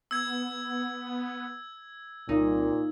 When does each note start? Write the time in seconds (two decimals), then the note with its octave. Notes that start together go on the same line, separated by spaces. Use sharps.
0.11 B3 E6 G#6
2.29 C2 A#2 D#4